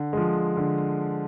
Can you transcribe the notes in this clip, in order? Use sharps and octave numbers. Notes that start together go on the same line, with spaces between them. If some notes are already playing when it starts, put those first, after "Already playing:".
Already playing: D3
F3 G#3
D3